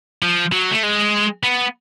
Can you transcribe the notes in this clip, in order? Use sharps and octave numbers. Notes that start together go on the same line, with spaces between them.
F3
F#3
A3
G#3
B3